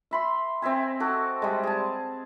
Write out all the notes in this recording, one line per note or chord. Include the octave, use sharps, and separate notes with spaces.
E5 B5 C6
C4 D#5 E5 G#5
F#4 A4
G3 G#3
G#4 A5